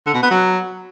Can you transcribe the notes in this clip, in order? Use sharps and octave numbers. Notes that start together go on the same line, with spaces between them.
D3
B2
B3
F#3